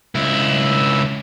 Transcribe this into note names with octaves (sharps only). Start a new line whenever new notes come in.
C#2 E4